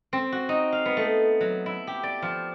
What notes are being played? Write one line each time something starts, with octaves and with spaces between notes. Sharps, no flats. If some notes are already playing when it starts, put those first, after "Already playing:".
C4
F#4
D#4
F5
B3
A3
F#3
E4
G4
D5
F3